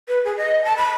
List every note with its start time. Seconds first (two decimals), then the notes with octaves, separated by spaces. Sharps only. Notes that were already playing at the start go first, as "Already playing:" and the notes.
0.08 B4
0.25 G#4
0.37 D#5
0.64 A5
0.77 B5